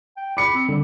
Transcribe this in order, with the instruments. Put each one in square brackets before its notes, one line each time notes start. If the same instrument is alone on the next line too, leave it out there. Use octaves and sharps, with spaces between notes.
[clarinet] G5
[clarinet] B5 [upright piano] D6 C#7
[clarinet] C4
[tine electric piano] D3 [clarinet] G3